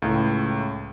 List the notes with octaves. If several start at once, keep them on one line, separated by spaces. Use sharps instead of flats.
C#2 A2